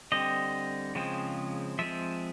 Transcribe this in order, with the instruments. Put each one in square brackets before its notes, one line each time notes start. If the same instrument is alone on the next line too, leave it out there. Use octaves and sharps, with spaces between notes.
[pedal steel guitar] D3 G3 C4 D#5
C#3 F3 G#3 C4
F3 G#3 C4 E5